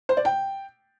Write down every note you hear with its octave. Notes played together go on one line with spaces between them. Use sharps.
C5
D5
G5